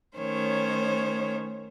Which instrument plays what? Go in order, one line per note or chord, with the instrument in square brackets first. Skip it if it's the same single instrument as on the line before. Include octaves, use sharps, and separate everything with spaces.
[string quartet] D#3 A3 C#4 C5 C#5